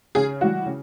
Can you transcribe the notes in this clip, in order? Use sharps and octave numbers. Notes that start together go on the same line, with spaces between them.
C#3 G#4
E3 G3 F#4
C#3